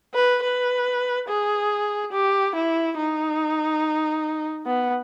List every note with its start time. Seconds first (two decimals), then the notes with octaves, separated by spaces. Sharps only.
0.14 B4
0.42 B4
1.28 G#4
2.12 G4
2.55 E4
2.97 D#4
4.66 B3